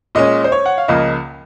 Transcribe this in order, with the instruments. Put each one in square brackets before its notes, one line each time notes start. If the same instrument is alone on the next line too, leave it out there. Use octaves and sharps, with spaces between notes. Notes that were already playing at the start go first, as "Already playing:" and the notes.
[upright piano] A#2 G#3 C#4 [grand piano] D#5
[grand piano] C5
C#5
F#5
F5
[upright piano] C#2 C#3 F3 A#3 [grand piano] D#5